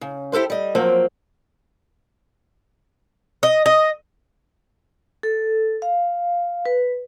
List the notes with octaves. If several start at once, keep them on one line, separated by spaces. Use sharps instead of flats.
C#3
E4 G4 A4 B4 C5
G3 D#5
F3 F#3 A#3 C4
D#5
D#5
A4
F5
B4